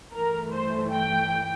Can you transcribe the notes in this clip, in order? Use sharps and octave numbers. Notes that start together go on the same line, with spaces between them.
G2 E3 A3 A#4
C5
G5